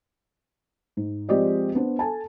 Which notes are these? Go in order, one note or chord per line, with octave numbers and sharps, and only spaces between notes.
G#2
F3 G#3 C4 G4 D5 D#5
B3 D4 C5
A4 G#5 A5